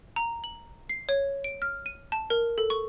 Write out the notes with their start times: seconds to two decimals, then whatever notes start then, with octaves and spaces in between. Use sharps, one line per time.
0.16 A#5
0.44 F#7
0.89 C7
1.09 C#5
1.44 D7
1.62 F6
1.86 D#7
2.12 A5
2.30 A#4
2.58 A4
2.70 C#6